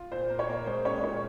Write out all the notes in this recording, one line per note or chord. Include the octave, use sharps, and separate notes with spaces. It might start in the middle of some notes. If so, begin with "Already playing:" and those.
Already playing: F4
A#2 C5
A#3
C#5
A#3
G#3 C5
C#4 C#5
A#2 C#5